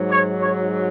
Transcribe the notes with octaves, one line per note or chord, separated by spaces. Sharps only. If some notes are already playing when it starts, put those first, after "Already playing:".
Already playing: G#2 F#3
C#5
C#5